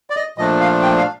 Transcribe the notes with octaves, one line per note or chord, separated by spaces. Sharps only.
D5
D#5
A#2 F3 A3 D4 D#5
F5
G5
F5